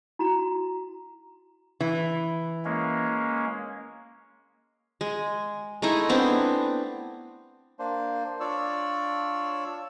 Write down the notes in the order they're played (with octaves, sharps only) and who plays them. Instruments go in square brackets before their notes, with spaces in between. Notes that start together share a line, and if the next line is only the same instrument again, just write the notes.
[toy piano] E4 F#4 A#5
[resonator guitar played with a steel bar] E3
[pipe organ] G#3 A#3 C#4
[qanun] G#3
G#3 A3 D#4 E4
B3 C4 D4
[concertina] A#3 D4 C5
D4 F4 C#5 D5 E6